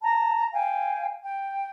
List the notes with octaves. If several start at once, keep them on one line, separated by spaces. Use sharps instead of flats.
A5 A#5
F5 G5 G#5
G5